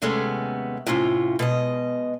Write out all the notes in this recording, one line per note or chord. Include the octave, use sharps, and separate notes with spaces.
D#2 C3 G#3 A3 B3 C#4
A2 C3 C#4 F4
B2 G#3 D#5